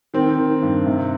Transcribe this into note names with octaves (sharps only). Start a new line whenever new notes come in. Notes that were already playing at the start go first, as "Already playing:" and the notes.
D#3 C4
D#3
G2
C3